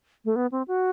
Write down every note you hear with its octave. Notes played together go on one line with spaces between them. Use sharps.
A3
B3
C4
F#4